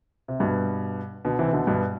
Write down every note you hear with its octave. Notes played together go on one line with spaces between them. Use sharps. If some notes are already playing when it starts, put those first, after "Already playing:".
C3
G2 B2
B2 D3
C3 E3
B2 D3
G2 B2